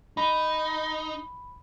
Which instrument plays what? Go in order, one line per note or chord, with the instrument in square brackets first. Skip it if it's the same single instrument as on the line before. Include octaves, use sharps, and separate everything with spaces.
[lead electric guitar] D#4 [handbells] B5